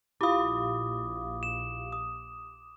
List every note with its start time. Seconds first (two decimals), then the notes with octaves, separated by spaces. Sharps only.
0.21 A#1 E4 F4 G4 F5 B5 D6 D#6
1.43 E7
1.92 D#6